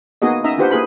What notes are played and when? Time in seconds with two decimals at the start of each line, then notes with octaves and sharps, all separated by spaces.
0.22 A#3 B3 D#4 F#4 G#4 D#5
0.44 C#4 D#4 D#5 E5 A#5
0.58 D4 F4 G4 B4 C5 F#5
0.71 A#3 E4 G#4 B4 B5